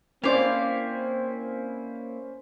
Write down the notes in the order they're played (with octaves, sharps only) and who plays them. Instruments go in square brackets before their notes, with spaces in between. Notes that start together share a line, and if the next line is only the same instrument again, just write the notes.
[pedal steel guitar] A#3 E4 [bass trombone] C4 [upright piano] C#4 C5 D5 [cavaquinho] F5 D6